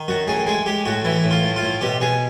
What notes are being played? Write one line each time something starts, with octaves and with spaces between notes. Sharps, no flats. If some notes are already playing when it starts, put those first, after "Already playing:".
Already playing: D#3
F#2 F#4
A2 G#4
G#3 G#4
G#3 G4
A2 F#4
E3 E4
A2
F4
A2
F4
A2
B2 G4
B2 G#4